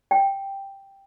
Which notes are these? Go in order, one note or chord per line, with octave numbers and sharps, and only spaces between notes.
G5